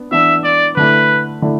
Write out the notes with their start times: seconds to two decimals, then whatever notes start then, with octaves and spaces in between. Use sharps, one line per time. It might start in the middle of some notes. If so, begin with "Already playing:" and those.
Already playing: B3 D4
0.11 E3 B3 D4 E5
0.44 D5
0.76 D3 A3 E4 B4
1.42 D3 A3 E4